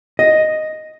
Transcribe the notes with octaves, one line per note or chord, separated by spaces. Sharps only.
D#5